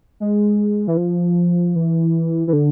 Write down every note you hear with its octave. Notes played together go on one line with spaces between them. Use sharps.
G#3
E3
F3
E3
E3
D3